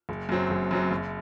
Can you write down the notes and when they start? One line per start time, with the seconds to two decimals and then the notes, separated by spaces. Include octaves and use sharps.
0.09 F#1
0.29 F#2 F#3 C4
0.50 F#1
0.71 F#2 F#3 C4
0.91 F#1